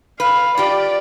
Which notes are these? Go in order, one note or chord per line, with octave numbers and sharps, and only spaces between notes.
B4 F5
F4 G4 D5